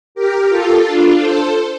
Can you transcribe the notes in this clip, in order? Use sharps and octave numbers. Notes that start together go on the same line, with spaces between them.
G4 A#4
F4 A4
D4 F4
A4 C5